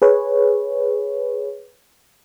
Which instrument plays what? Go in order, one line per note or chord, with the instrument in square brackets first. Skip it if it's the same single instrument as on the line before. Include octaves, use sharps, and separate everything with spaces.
[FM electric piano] G#4 B4 C#5